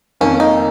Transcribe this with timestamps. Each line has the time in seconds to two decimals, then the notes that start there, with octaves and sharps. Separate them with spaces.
0.21 F2 D#3 A#3 C#4
0.40 D#4